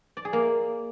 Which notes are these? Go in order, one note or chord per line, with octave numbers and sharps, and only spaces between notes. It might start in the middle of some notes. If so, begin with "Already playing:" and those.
D5
G#4
A#3